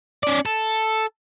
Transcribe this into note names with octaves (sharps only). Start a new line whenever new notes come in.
C#4 D5
A4